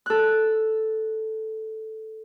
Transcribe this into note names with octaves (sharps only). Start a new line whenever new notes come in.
A4 F#6